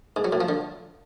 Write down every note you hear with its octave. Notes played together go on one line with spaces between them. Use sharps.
G#2
F#3
A2
F3
D3